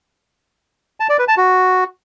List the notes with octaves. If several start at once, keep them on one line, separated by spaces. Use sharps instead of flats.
A5
D5
B4
A5
F#4